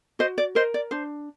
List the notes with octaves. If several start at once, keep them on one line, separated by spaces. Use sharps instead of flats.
F#4 C5 D#5
D5
A#4 C5 D#5
D5
D4 C5